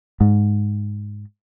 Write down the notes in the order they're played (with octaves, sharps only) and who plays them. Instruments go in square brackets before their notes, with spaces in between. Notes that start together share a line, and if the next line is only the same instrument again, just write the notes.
[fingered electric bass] G#2